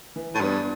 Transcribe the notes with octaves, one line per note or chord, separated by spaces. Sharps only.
E3
A2
G2 B3 D4